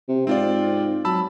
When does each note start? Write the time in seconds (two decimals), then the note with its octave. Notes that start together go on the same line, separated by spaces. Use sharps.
0.08 C3
0.27 G#2 C4 F4 D5
1.05 F#3 A5 B5 E6